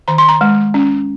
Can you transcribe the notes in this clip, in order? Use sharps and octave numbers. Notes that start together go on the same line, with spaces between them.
D#3 A#5
C6
A#5
G#3
C#4